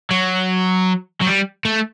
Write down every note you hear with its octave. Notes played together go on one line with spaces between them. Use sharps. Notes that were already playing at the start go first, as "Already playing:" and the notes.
F#3
F#3
G3
A3